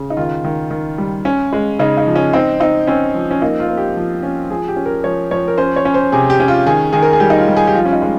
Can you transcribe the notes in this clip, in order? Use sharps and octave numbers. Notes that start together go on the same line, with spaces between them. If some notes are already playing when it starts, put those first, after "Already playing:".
Already playing: C#3
D#4
D#3 F4
D#3
D#3
G3
C#4
G#3
C#3 D#4
D#4
F3
C#4
C4 D#4
C4 D#4
C4 C#4
F3
C#4
A#3 D#4
F4
A#3
G4
F3
C#4
F3 G#4
G4
C#4
A#4
F3 C#5
F3 C#5
A#4
C#4 C5
C#5
C#4
C5
C3 G#4
G4
C#4
F4
D#3 G#4
D#3 G#4
A#4
G#4
G3 G4
D#4
F4
G3
G#4
G4
F3 F4
C#4
D#4
G#3